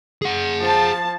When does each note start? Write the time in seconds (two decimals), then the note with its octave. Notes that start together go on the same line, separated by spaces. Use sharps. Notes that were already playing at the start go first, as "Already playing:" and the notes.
0.22 G#4 F#5
0.60 F3 A5